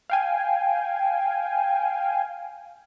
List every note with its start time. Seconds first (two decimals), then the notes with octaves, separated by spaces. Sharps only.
0.10 F5 G5 G#5